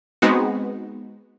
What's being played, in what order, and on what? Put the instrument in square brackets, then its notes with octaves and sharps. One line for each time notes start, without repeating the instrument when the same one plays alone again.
[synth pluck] G#3 B3 C4 D#4 F#4